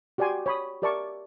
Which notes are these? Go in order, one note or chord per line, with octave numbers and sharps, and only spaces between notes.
F#4 G4 D5 G5 G#5 C6
C#5 B5 D#6
G4 A#4 D5 E5 A5 C#6